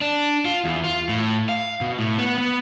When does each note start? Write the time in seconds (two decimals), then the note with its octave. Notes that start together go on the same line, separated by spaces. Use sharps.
0.01 D4
0.45 F4
0.65 E2
0.84 F4
1.09 A2
1.49 F5
1.81 B2
1.98 A2
2.18 B3
2.38 B3